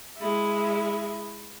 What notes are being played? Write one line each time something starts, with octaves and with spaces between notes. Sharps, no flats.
G#3 E4